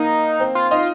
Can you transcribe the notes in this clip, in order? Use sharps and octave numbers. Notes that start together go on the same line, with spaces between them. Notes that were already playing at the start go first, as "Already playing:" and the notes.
Already playing: A#3 D#4 A#4
C4 C5
F4
D#4 F4 D#5